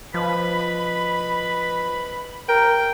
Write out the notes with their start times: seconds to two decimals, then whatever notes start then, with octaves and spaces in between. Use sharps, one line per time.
0.14 F3 B4 D#5 B5
2.49 A#4 G5